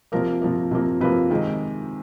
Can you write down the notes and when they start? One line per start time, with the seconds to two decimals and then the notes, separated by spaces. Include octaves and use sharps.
0.12 C3 F3 A#3 A#4
0.42 C3 F3 A#3
0.71 C3 F3 A#3
1.01 C3 F3 A#3 B4
1.30 C3 D#3 G#3